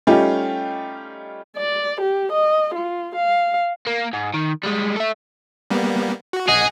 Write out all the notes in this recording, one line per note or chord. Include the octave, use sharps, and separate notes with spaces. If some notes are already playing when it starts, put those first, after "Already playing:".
G3 A3 C#4 D#4 F4 G4
D5
G4
D#5
F4
F5
A#3
G#2
D#3
G3 G#3
A4 E5
G3 A#3 B3
F#4
A#1 G#4 D#5 F#5